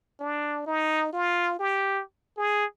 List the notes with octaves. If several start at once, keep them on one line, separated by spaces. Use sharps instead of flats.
D4
D#4
F4
G4
G#4